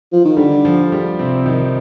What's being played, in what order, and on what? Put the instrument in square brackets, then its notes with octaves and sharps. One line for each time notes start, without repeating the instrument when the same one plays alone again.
[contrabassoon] F3
D#3
[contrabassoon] D3 [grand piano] G3
[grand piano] F3
G3
C3 C4
D#3 D#4